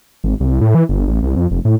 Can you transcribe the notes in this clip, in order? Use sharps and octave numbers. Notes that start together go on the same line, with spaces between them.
G#1
C2
A2
E3
G1
A1
C2
F2
F1
A2